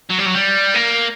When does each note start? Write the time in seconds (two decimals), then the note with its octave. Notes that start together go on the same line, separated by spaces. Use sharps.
0.10 F#3
0.18 G3
0.26 F#3
0.34 G3
0.75 A#3